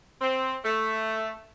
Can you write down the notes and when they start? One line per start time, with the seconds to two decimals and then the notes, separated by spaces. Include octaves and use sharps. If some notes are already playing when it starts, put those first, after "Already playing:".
0.20 C4
0.65 A3